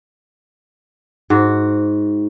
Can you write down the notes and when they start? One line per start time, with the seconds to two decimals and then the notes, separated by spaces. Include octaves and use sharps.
1.30 G#2 F#4